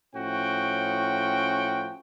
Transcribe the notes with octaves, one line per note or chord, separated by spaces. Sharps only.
A2 F3 C#4 F#4 G5